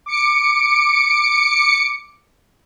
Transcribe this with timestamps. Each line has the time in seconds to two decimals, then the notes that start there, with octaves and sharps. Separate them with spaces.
0.06 D6 C#7 D7